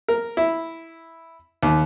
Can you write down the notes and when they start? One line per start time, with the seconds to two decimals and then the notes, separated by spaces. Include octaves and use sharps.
0.08 A#4
0.37 E4
1.63 D#2